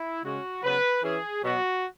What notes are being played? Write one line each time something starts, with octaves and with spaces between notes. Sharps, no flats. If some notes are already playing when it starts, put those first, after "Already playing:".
Already playing: E4
C#3 G#3 C#4 F#4
C#3 F#3 B3 B4
E3 C#4 G#4
B2 F#3 B3 F#4